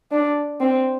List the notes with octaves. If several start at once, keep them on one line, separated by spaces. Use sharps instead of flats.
D4
C4